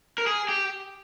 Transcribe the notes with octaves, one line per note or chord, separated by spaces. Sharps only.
A#4
G#4
G4